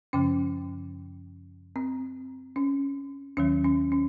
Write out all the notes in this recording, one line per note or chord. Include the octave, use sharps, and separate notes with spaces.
F#2 C#3 F3 C#4
C4
C#4
D#2 D#3 F#3 C#4
C#4
C#4